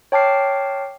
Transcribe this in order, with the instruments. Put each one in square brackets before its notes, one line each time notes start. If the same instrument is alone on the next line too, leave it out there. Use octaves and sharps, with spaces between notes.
[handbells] C#5 G5 A5 D6 F6 C7